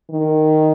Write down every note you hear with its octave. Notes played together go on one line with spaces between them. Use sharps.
D#3